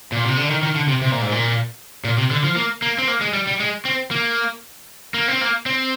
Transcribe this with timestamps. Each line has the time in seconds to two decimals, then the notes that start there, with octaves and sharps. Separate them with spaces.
0.12 A#2
0.25 C3
0.37 D3
0.50 D#3
0.63 D#3
0.75 D3
0.88 C3
1.02 C3
1.12 A#2
1.22 G#2
1.32 A#2
2.05 A#2
2.18 C3
2.31 D3
2.44 F3
2.56 A#3
2.82 A#3
2.98 C4
3.08 A#3
3.21 G#3
3.33 G3
3.47 G3
3.60 G#3
3.85 C4
4.11 A#3
5.14 A#3
5.28 C4
5.41 A#3
5.66 C4